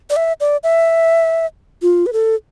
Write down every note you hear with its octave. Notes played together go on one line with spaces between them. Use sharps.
D5
E5
D5
E5
F4
B4
A4